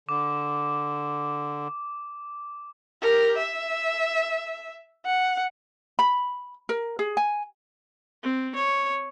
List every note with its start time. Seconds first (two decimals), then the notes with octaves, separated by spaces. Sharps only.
0.09 D3 D6
3.02 G4 A#4
3.38 E5
5.06 F#5
5.99 B5
6.69 A#4
6.99 G#4
7.17 G#5
8.23 C4
8.55 C#5